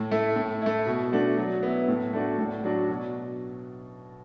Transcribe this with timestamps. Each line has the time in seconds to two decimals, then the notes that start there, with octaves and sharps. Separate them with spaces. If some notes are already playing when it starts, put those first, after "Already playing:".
Already playing: A2
0.11 A3 E4
0.36 A2
0.62 A3 E4
0.86 B2
1.12 A3 D4 F#4
1.37 F#3
1.63 B3 E4
1.88 A2
2.13 A3 D4 F#4
2.39 A2
2.64 F#3 D4 F#4
2.89 B2